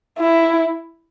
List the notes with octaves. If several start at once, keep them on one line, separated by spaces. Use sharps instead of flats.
E4